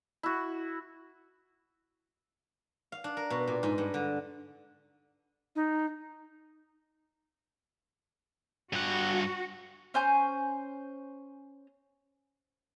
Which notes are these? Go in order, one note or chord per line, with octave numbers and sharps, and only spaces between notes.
E4 F#4
F5
D4
A#4
B2
A#2
G#2
G2
D3
D#4
G2 F#4 F#5
C#4 C5 G#5 G6